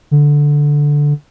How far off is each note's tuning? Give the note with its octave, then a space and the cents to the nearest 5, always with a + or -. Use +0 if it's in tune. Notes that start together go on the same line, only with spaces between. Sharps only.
D3 -5